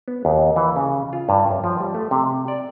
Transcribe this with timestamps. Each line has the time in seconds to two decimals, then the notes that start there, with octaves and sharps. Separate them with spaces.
0.08 B3
0.25 D#2
0.56 E3
0.76 C#3
1.13 F4
1.29 G2
1.51 F#2
1.64 F3
1.80 G3
1.95 A3
2.11 C3
2.48 D5